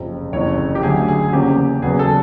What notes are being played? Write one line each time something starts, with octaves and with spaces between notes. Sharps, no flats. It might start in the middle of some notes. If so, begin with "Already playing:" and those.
Already playing: F#1 F2 C3 F3
F#1 F2 C3 E3 C#5
G4
D2 D3 F#3 A3 G#4
G#4
E2 C#3 F3 A#3 C#4 G4
E1 E2 C#3 F#3 B3 G#4
A4